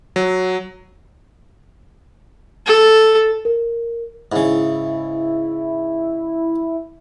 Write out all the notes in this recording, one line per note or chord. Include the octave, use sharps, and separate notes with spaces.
F#3
A4
A#4
G#2 C#3 E4